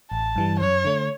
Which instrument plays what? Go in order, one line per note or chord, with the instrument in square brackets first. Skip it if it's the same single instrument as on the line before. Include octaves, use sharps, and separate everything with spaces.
[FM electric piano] A1 [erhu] A5
[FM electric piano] G2 E3 G3
[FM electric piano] F#2 [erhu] C#5
[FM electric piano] D3 A3